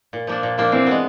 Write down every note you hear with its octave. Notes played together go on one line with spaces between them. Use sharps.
A#2
F3 A#3 D4
A#2
F3 A#3 D4
E3 C4
G#3 B3